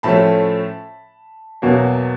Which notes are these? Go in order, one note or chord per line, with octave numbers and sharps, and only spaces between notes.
A2 F3 A3 C#4 A5 B5
E2 B2 F#3 A#3